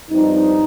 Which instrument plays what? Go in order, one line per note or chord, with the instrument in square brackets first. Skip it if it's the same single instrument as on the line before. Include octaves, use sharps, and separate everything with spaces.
[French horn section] G2 F3 C4 D#4